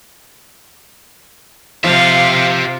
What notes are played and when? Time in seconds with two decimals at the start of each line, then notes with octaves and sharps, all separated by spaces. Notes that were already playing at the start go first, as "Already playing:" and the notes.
1.84 C3 F3 G4 E5 F5